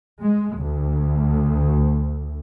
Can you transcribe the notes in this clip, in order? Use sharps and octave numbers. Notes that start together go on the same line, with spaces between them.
G#3
D2